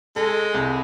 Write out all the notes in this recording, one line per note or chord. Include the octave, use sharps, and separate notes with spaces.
G#3 A4
C2